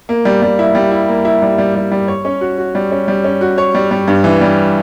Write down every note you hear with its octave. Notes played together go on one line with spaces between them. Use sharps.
A#3
G3
G3
E4
G3
E4
A#3
E4
G3
G3
G3
G3
C#5
C#4
F#4
F#4
G3
C#4
G3
C#4
F#4
C#5
G3
G3
G2
E3
G3